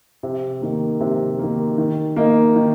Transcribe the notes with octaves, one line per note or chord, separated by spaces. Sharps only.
C3
D#3 A#3
C3
D#3 A#3
D#3
A#3 D#4
D#3